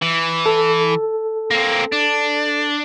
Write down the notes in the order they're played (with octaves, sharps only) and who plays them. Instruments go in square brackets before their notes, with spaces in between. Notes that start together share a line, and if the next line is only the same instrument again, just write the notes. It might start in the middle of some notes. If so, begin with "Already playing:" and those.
[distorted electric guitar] E3
[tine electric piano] A4
[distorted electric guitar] A#3 C4
D4